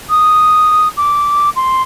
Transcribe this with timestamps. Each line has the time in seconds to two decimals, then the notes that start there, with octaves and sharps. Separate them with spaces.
0.09 D#6
0.97 D6
1.56 C6